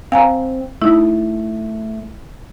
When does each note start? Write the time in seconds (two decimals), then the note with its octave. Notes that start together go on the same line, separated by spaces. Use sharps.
0.12 C4 F5 G#5 A#5
0.82 A3 D#4 E4